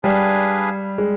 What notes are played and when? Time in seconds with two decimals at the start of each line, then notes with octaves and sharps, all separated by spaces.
0.03 G3 D4 G#4 B4 F5 G#5
0.98 G#3